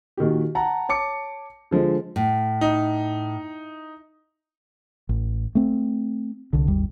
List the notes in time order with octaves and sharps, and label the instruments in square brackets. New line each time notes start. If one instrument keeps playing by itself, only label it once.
[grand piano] A#2 D#3 F#4 G4
F#5 A5 A#5
C#5 A5 D6 C#7
D3 F3 G#3
[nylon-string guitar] A2
[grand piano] D#4
[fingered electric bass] A1
A3 C4
C2 D3
G#1 D#2 G3